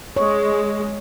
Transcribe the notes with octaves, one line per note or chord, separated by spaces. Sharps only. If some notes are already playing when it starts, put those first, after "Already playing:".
G#3 C#5